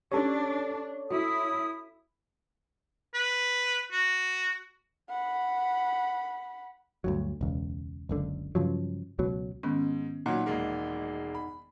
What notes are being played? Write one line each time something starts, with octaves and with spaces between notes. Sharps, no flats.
C#4 D4 G4 A4 C#5
E4 F#4 D#6
B4
F#4
F#5 B5
D2 G2 F#3
E1 C#2
F#1 C#2 D3
G2 C#3 F3 F#3
C#2 B2 F#3
G#2 D#3 B3 C#4
A#2 F#3 D#4 F#5
E1 G#3 A#3
B5